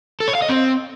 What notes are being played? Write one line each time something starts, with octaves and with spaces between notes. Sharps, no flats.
A4
C#5
F5
D#5
C4